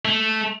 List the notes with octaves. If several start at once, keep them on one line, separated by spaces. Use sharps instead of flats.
A3